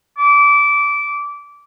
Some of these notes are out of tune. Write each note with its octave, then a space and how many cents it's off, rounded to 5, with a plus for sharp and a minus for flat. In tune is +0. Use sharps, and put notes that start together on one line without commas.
D6 -20